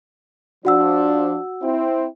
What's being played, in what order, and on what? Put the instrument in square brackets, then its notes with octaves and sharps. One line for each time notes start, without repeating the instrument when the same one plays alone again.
[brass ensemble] F3 D4 [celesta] F#4 F#5 E6
[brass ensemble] C4 E4